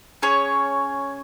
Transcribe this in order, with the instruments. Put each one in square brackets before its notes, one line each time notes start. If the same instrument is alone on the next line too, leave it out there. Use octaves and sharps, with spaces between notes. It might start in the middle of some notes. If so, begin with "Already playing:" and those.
[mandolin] C#4 G#4 C#5